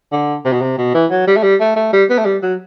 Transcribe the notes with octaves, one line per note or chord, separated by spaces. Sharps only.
D3
C3
B2
C3
B2
E3
F#3
G3
A3
G3
A3
A3
G3
B3
A3
G3
F#3